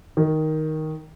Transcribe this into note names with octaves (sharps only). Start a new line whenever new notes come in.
D#3